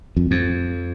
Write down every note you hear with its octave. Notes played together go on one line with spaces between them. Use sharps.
F2
F2